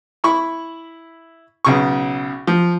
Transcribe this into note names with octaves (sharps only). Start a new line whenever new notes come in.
E4 B5 C#6
B1 C#3 C#6
F3